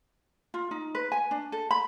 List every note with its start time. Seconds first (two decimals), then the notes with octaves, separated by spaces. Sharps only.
0.54 F4
0.71 D#4
0.95 B4
1.12 G#5
1.31 D4
1.52 A4
1.71 B5